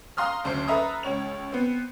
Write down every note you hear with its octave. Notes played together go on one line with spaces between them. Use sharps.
F5 A#5 C6 D#6 F6
F#1 D2 C5 C7
A4 B4 E5 A#5 D#6
C#2 C#5 F7
B3 C4